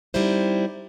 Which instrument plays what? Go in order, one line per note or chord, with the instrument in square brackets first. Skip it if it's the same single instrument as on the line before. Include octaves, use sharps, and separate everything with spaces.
[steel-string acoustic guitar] G3 C4 D#4 E4 C5